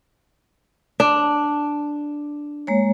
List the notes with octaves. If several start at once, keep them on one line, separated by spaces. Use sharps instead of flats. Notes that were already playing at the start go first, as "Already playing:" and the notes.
D4
G#3 A#3 C#5